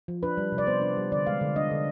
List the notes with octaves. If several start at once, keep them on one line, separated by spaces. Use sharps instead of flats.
F3
D4 B4
G3
C3
D5
B3 C5
D4
G3
D3 D5
G#3 F5
D3
D4 D#5
D3